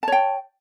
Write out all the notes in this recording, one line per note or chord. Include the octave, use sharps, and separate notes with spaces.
C#5 G5 A5